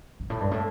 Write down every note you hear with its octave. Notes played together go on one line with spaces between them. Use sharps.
G2
A2
G2
A2